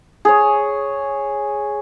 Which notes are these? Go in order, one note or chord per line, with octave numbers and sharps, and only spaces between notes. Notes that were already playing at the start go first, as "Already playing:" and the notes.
G#4 C#5